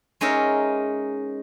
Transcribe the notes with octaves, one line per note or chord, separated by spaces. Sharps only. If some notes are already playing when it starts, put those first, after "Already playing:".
G#3 C#4 D#4 A#4 E5